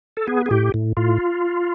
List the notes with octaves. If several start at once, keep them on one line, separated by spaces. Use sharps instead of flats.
A4
B3 G#4
G#4
A2 G4
A2
A2 F4